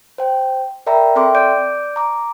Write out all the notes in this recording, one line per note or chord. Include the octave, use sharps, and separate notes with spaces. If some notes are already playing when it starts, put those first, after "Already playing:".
C5 G5
A#4 D5 E5 G5 A#5 B5
C4 A4 E5 G5 C6 D6
D5 D6 G6 D7
A#5 D6